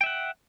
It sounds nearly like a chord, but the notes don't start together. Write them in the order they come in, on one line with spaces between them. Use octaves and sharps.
G5 E5 F#5